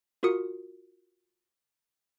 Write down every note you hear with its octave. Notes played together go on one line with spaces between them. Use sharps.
F4 F#4 A#4 D#6 C#7